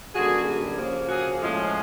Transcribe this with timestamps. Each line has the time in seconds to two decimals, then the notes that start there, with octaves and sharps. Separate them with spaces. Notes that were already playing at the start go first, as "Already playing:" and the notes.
0.14 F#2 D3 G3 A#3 F#4 G#4
0.77 C#3 F3 A#3
1.09 F#4 G#4
1.41 A2 F3 G#3 C#4